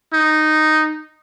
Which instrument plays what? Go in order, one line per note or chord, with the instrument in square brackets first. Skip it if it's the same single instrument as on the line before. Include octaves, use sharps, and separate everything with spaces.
[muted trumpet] D#4